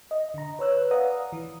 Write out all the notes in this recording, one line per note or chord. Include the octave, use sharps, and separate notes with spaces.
D#5
D3 A#5
B4 C#5 E6 F#6
B4 D5 F5 F#5 A#5 D#6
E3